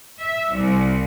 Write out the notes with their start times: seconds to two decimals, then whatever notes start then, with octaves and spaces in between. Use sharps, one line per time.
0.21 E5
0.53 C2